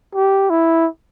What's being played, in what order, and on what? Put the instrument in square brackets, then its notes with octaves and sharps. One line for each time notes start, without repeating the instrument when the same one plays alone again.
[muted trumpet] G4
E4